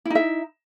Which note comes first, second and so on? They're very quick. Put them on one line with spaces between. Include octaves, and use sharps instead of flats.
E4 D#4 E5